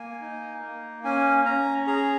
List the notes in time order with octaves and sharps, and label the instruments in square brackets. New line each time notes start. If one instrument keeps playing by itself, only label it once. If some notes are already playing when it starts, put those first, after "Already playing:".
Already playing: [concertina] A#3 G#5
D#4
A#3
C#4 G#5
C#4 A#5
G#4 A#5